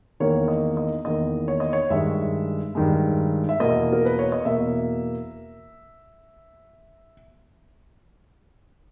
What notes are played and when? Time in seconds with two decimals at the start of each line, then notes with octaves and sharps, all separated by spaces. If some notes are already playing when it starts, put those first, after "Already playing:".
0.20 E2 D#3 A#3 C#5
0.48 D#5
0.77 D#5
1.05 E2 D#3 A#3 D#5
1.48 C#5
1.60 D#5
1.73 C#5
1.90 G2 D#3 G#3 E5
2.75 G2 D#3 G#3
3.49 E5
3.60 E2 B2 A#3 D#5
3.93 A#4
4.05 B4
4.19 C#5
4.32 D#5
4.45 E2 B2 A#3 E5